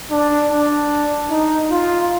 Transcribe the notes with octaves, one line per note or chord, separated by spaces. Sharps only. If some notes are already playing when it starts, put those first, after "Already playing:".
D4
D4
D#4
F4